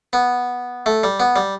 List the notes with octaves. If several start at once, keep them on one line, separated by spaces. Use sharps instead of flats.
B3
A3
G3
B3
G3